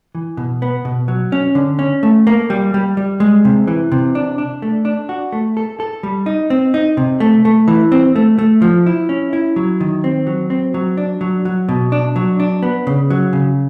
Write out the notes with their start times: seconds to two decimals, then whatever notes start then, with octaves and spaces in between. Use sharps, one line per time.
0.15 E3
0.37 B2
0.62 B3
0.85 B2
1.08 F#3
1.32 C#4
1.55 D3
1.79 C#4
2.03 A3
2.27 A#3
2.50 G3
2.74 G3
2.97 G3
3.20 G#3
3.45 C3
3.67 E3
3.92 C3
4.15 D4
4.38 D4
4.62 A3
4.85 D4
5.09 F#4
5.32 A3
5.57 A4
5.80 A4
6.03 G3
6.26 D#4
6.50 C4
6.74 D#4
6.97 C3
7.20 A3
7.45 A3
7.68 E3
7.92 C4
8.16 A3
8.39 A3
8.62 F3
8.86 E4
9.09 C#4
9.33 E4
9.56 F#3
9.81 D#3
10.04 C4
10.27 F#3
10.50 C4
10.74 F#3
10.97 D4
11.21 F#3
11.45 F#3
11.69 B2
11.92 D4
12.16 F#3
12.40 D4
12.63 B3
12.87 C#3
13.10 F#3
13.33 C#3